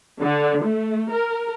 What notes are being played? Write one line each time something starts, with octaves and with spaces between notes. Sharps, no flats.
D3
A3
A#4